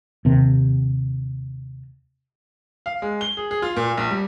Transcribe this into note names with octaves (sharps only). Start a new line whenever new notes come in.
D#2 C3
F5
G#3
G7
G#4
G#4
F4
A#2
A#1
G3